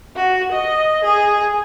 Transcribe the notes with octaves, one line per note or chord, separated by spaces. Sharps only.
F#4
D#5
G#4